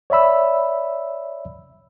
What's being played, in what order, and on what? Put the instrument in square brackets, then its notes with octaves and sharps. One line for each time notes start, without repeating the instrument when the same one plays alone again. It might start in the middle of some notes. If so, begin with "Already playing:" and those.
[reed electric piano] C#5 D5 E5 B5 E6